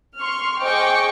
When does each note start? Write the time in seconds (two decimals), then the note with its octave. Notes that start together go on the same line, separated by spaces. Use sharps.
0.20 C6 C#6 F6
0.64 G#4 C5 D#5 G5 C#6 D6